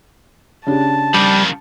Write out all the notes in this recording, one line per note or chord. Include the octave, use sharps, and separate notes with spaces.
C#3 D4 G4 A5
F2 D#3 G3